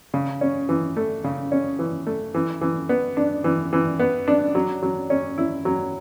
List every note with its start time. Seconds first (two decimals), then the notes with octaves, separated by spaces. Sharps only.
0.14 C#3
0.41 C#4
0.69 E3
0.97 A3
1.24 C#3
1.52 C#4
1.79 E3
2.07 A3
2.35 E3
2.61 E3
2.89 B3
3.17 D4
3.44 E3
3.73 E3
3.99 B3
4.28 D4
4.55 F#3
4.82 F#3
5.10 C#4
5.38 E4
5.65 F#3